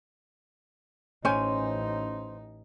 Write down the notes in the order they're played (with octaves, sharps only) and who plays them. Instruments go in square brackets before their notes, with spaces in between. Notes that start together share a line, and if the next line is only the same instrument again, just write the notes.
[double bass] A1 D#4 [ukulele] C#4 G#5 [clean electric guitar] C5